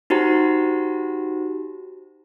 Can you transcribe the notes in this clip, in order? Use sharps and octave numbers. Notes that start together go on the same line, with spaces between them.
D#4 F#4 G4 C5 A#5